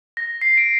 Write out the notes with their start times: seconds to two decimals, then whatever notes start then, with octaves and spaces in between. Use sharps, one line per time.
0.17 A#6
0.41 C7
0.57 D7